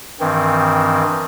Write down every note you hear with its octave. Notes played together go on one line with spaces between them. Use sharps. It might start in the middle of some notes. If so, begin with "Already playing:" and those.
G2 D#3 E3 C4